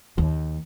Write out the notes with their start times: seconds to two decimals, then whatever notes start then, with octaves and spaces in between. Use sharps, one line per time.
0.18 D#2